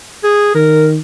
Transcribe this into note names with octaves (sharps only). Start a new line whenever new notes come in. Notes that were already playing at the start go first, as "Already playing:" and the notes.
G#4
D#3 A#4